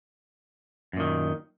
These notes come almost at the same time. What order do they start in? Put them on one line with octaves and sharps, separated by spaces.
F#2 A#2 D#3